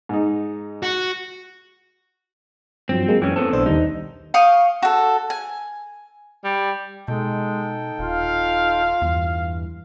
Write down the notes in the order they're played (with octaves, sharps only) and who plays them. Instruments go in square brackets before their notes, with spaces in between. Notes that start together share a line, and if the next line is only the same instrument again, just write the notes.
[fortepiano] G#2 D#4
[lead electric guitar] F#4
[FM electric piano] G2 F3 F#3 [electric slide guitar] C4
[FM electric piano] F#3 G#3 A#3
[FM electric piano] F#2 G5 [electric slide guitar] E3 C#4
[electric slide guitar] A2 B3 A4 [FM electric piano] C4
[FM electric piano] B1 D4 C5
[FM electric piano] D#2 D#3 G3 [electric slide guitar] D#4
[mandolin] F5 G5 C#6 D#6
F#4 A4
G#5
[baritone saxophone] G3
[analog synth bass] B2 [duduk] G#3 [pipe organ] D#4 A4 G5
[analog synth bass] D#1 [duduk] F4 [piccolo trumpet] F5
[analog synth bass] E2 [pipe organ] G2 E3